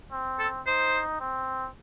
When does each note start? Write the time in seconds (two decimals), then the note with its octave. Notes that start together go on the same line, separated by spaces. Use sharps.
0.12 C4
0.39 A4
0.67 D#4 C5
1.20 C4